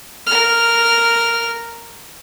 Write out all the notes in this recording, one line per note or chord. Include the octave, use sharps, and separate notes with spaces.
A#4 F6